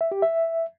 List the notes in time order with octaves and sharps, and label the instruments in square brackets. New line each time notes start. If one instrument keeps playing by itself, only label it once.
[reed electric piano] E5
G4
E5